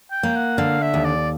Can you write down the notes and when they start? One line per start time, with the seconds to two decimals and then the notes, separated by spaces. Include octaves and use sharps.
0.11 G5
0.23 A#3
0.36 F#5
0.58 D3 F5
0.82 E5
0.94 D#2
1.05 D5